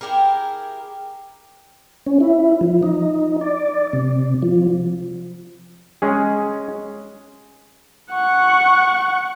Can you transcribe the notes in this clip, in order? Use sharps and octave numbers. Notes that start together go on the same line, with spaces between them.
E4 G4 G#4 A#4
C#4
E4
F3
D#4
D5
C3
F3
G#3 C#4 G#4
F#5 C#6